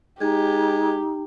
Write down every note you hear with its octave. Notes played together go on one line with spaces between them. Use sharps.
G#3 D#4 G4